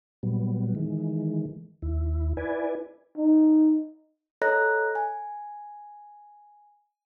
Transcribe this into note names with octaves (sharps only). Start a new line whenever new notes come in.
A#2 F#3 G3 B3
D#3 E3 G#3
D#2 E4
E4 B4 D5 G#5
D#4
A4 C#5 D#5 A#5 F#6 A#6
G#5